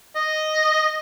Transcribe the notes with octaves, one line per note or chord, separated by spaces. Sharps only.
D#5